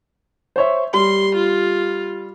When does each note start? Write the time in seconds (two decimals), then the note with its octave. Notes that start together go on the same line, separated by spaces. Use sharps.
0.56 C5 C#5 E5
0.94 G3 C6
1.36 F4